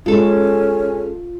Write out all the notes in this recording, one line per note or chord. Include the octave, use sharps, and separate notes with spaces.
G#3 C#4 F4 A4